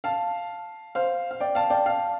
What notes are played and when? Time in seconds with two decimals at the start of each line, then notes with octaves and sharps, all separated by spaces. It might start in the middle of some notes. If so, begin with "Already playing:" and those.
0.04 F5 A5
0.95 C5 F5
1.31 F5
1.40 D5 G5
1.55 F5 A5
1.70 D5 G5
1.86 F5 A5